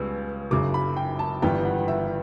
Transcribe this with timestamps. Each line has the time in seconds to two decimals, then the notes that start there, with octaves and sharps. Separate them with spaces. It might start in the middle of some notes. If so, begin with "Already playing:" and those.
Already playing: C#2 C#3 G3 B3 E6
0.51 F#1 F#2 C#3 D6
0.74 B5
0.97 G5
1.19 A5
1.42 G1 G2 E3 G3 B3 G5
1.65 F#5
1.88 E5